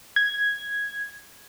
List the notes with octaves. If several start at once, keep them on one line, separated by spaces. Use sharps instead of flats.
G#6